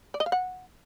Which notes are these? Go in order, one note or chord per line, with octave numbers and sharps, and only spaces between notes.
D5
D#5
F5
F#5